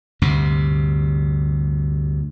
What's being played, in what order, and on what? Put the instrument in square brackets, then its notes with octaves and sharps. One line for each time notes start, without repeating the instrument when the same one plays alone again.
[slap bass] D2 G2 C3